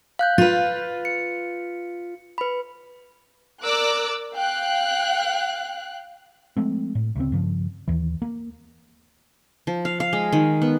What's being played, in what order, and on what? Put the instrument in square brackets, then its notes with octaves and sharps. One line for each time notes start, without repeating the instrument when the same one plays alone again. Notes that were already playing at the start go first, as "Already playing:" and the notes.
[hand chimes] F5 F#6 G6
[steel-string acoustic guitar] F4 B4
[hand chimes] C#7
B4 B5
[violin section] A#4 D5 D6 E6 F#6
F5 G5 F#6
[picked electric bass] F3 G#3 A3 C4
A2
D2 C#3 C4
G2 C#3 F3
D#2 E3
A#3
[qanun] F3
F5
F5
G#3
D#3
B3